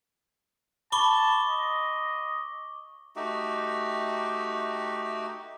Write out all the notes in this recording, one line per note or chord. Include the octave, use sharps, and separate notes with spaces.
A5 B5 C#6 D6 G7
D#5
A3 D#4 F#4 G4